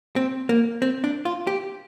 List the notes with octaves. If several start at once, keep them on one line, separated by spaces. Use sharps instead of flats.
C4
A#3
C4
D4
F4
G4